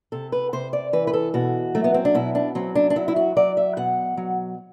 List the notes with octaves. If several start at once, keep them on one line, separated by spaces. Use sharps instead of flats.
C3 A4
B4
C3 C5
D5
E3 B4
B4
A4
B2 F#4
F#3 A3
B3
C4
D4
B2 E4
D4
F#3 C4
D4
D4
F#3 E4
E4
F#4
F#3 D5
E5
B2 F#5
F#3